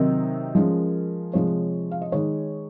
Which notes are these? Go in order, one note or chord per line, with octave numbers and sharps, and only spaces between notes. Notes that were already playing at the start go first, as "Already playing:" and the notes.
Already playing: C3 D#3 F#3 C4 D#4 A#4
F3 G#3 C#4
C3 F3 G#3 C#5
F5
D#5
D#3 G#3 D#4 C#5